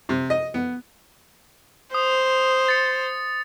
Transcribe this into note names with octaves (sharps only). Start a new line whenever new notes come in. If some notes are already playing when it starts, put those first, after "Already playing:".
C3
D#5
B3
C5 D#6
A6 C#7